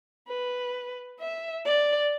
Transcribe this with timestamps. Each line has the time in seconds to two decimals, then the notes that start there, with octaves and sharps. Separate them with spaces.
0.28 B4
1.20 E5
1.65 D5